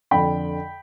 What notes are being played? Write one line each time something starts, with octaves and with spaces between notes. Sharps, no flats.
F2 D3 G5 B5